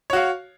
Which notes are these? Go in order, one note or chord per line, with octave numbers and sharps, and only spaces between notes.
F#4 C#5 F5